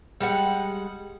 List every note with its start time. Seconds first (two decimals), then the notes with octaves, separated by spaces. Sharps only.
0.20 G3 G#3 F#5